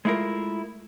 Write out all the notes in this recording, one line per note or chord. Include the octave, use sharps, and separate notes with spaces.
G#3 A3 E4 F4 A#4